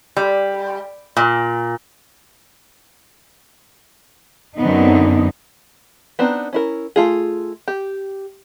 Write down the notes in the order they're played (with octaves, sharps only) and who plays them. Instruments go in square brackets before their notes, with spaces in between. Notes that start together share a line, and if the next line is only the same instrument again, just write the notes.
[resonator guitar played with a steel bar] G3
A#2
[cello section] F#2 D3 B3 C4 D#4
[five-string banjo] B3 C4 D4 D#4
C#4 E4 A#4
A3 F4 G#4
G4